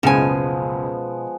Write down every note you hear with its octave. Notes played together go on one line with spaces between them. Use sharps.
F#1 C#2 B2 F3 G#3 B3 G#5